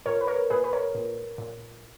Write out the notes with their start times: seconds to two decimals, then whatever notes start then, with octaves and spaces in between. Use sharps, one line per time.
0.06 A#2 A#4 C#5
0.21 B4
0.27 A#4 C#5
0.50 A#2 G#4 B4
0.64 B4
0.73 A#4 C#5
0.95 A#2
1.38 A#2